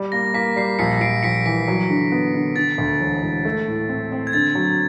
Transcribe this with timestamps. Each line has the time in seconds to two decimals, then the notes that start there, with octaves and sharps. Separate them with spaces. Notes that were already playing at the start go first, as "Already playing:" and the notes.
Already playing: G3
0.12 A#3 A#6
0.34 A#3 B6
0.56 G3 C7
0.79 A#1 B6 C#7
1.00 A#1 C7 D7
1.23 A#1 B6 C#7
1.46 E3 B6
1.68 F#3
1.90 D3
2.12 B3
2.34 D3
2.56 D3 A6
2.78 D2
3.00 E1
3.23 E1
3.45 A3
3.68 A2
3.89 C4
4.12 C4
4.27 G#6
4.33 D3 A6
4.55 F#3